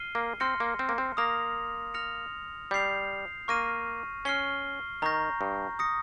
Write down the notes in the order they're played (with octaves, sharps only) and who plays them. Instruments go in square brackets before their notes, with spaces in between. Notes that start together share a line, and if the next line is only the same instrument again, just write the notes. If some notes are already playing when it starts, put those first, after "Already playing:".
Already playing: [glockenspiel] F6 C7 D#7 G7
[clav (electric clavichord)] A#3
[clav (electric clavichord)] C4 [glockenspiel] C6 F6 A#6 C#7
[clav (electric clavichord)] A#3
C4
A#3
C4
[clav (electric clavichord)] A#3 [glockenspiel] D#6 A#6 F7
[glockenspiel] F6 A#6 C#7 F7
[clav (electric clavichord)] G3 [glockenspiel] G6 C7 F7
[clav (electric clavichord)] A#3 [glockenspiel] C#6 F6 A#6 D#7
[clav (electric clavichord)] C#4 [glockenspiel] F6 C7 G7
[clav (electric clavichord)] D#3 [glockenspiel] A#5 C#6 G6 A#6
[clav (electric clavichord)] G2
[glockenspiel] D#6 A#6 C#7